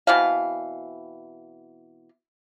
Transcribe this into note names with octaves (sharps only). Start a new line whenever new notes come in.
B2 E3 C4 F5